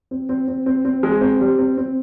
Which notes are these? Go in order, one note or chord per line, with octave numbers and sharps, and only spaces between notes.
C4
C4
C4
C4
C4
G#3
C4
G3
C4
C4